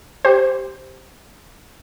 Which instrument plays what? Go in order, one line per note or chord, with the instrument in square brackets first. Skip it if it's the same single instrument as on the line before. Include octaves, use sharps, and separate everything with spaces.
[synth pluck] G4 C5